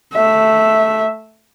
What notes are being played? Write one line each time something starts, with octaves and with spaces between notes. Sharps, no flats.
A3 E5